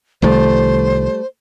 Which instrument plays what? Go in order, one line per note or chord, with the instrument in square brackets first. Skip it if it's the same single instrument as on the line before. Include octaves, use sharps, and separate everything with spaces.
[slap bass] C2 D#3 F3 [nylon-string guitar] G3 A3 [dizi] C5